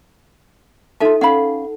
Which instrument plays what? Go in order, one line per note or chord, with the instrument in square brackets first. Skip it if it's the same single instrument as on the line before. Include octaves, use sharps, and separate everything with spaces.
[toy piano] D#4 A4 A5 [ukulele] F4 E5
[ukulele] C#4 F5 B5 [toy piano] F#5